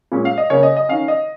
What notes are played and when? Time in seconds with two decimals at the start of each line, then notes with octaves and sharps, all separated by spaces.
0.12 A#2 G#3 C#4
0.25 F5
0.38 D#5
0.50 C#3 A#3 C#4 C#5
0.63 D#5
0.77 D#5
0.89 D#3 C#4 F5
1.08 D#5